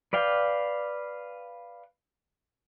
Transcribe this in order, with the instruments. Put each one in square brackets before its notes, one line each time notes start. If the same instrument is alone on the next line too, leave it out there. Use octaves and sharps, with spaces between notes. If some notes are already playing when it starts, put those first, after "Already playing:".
[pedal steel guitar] B4 D5 F5 G5